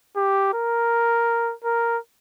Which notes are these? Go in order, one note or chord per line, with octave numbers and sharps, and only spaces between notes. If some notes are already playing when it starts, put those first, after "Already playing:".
G4
A#4
A#4